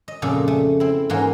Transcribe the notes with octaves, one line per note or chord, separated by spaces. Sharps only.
D#5
F2 A#2 C#3 A4 D5
A3
C4 E4
G#2 E3 A#3 C#4 F#4 A#4